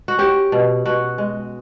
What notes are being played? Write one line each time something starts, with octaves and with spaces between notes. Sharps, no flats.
F#4
C#4 G4
B2
B2 F#4
G#3